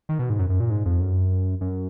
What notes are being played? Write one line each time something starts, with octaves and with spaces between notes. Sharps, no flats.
D#3
B2
G#2
F#2
F#2
A#2
G#2
F2
F#2
F#2